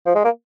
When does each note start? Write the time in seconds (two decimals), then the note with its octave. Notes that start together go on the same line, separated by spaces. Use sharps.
0.06 F3
0.15 G#3
0.24 A#3